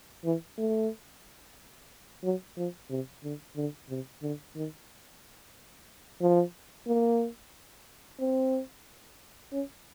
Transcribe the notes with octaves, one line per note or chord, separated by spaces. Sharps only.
E3
A3
F#3
F3
C3
D3
D3
C3
D3
D#3
F3
A#3
C4
C#4